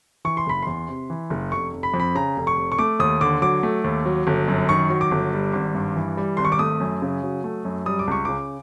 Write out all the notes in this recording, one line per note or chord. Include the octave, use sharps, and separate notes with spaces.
E3 C#6
C6
F#1 B5
E2 C6
C3
E3
F#1
F1 C#6
F1
B5
F2
B5
C#3 A#5
F1
C#6
F1
C#6
A3 D6
D#2 D#6
D3 D6
F#3 D6
A3
D#2
F#3
G1
F#2
D#3 C#6
F#3
D6
G1
G3
G#1
G2
E3
G3
G#1 C6
C#6
D6
A3 D#6
F#2
C#3
F#3
A3
F#2
G3 D#6
D6
C#2 C#6
C#3 D6